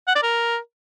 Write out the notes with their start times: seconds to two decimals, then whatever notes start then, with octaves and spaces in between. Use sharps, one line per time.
0.08 F#5
0.15 D5
0.23 A#4